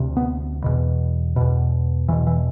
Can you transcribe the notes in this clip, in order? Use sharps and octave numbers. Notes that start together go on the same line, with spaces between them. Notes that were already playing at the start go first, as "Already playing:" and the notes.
Already playing: D2 C3
B3
E2 B2
E2 B2
E2 B2 E3
E3